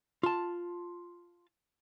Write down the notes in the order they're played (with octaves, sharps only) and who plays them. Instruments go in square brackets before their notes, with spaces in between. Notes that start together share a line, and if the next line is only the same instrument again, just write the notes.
[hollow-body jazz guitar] F4 A5